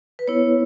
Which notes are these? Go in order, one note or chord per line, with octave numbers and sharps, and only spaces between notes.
B4
B3 E4 C#5